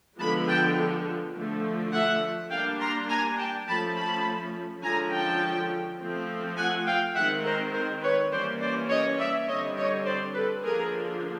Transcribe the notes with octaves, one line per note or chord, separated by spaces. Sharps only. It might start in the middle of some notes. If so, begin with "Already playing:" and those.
D3 F3 G#3 B3 A5 B5
G5 A5
D3 F3 A3
E5 F#5
G3 A#3 D4 F5 G5
A#5 C6
G#5 A#5
G5 A5
F3 A3 C#4 A5 B5
A5 B5
D3 F3 G#3 C#4 G#5 A#5
G5 A5
F3 A3 C4
F#5 G#5
F5 G5
D#3 G#3 C4 E5 F#5
A#4 C5
A#4 C5
B4 C#5
E3 G3 A#3 C#4 C5 D5
C5 D5
C#5 D#5
D5 E5
D3 G3 C4 C#5 D#5
C#5 D#5
C5 D5
A4 B4
D3 F3 A#3 D4 G#4 A#4